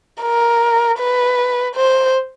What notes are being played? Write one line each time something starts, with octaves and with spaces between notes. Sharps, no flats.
A#4
B4
C5